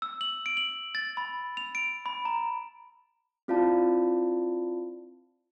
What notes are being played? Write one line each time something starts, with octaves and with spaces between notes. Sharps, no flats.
E6
F#7
D7
F#7
A6
B5
F7
D7
B5
A#5
C4 E4 F4 D5 F5 A5